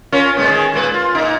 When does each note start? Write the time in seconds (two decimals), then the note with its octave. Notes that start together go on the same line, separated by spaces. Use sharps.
0.12 C#4 F4 A#4
0.37 A2 G#3 B3
0.49 D#3 G#4
0.74 A#2 G#3 B4
0.94 F4
1.15 A#2 D#4